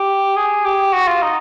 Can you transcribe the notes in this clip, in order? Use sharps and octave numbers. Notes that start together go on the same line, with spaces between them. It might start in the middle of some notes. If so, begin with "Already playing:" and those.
Already playing: G4
G#4
G4
F#4
F4
D#4